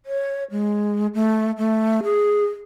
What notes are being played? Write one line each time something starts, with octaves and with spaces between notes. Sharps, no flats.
C#5
G#3
A3
A3
G#4